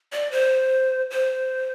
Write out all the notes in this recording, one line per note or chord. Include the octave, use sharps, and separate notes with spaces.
D5
C5
C5